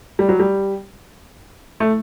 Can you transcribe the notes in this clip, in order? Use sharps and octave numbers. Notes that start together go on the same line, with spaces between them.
G3
F#3
G3
A3